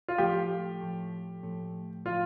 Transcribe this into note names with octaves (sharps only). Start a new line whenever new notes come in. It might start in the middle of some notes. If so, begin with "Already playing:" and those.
F4
A2 F3 A3 G4
A2 F3 A3
A2 F3 A3
A2 F3 A3 F4